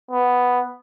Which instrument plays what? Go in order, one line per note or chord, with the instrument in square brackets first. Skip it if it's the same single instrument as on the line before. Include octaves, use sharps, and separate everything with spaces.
[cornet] B3